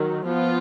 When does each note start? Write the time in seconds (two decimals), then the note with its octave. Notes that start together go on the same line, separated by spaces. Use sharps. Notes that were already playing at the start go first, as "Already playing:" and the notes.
Already playing: D#3 F#3
0.26 F3 B3 F4